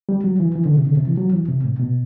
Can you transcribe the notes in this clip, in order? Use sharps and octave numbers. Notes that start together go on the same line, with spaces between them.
G3
F#3
E3
E3
D3
C3
D3
C3
E3
F#3
E3
C3
A2
B2